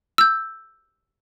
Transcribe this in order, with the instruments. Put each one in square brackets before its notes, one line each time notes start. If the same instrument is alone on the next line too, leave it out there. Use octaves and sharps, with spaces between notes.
[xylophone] E6 G6